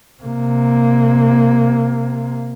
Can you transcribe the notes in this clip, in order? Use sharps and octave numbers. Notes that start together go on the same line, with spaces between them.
C3 A#3